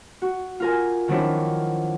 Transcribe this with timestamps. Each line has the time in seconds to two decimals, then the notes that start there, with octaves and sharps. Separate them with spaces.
0.22 F#4
0.60 F4 A#4 G#5
1.08 D#3 F3 F#3 C4 D4 E4